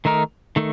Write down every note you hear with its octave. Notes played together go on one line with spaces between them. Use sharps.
D#3 A3 D#4 A#4
D#3 A3